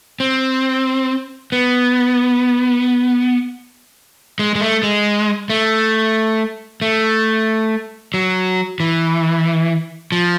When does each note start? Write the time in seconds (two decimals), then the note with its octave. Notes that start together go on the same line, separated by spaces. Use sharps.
0.20 C4
1.52 B3
4.39 G#3
4.55 G#3
4.61 A3
4.83 G#3
5.50 A3
6.82 A3
8.14 F#3
8.80 E3
10.12 F3